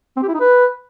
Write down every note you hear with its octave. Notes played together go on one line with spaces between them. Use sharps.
C4
G4
E4
D#4
B4